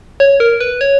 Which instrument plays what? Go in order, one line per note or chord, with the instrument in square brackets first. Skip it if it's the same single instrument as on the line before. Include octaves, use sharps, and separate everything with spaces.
[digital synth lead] C#5
A#4
B4
C#5